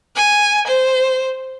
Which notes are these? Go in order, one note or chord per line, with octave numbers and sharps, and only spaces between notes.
G#5
C5